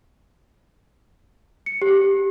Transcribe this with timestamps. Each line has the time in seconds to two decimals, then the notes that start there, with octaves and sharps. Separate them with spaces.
1.66 C#7
1.82 G4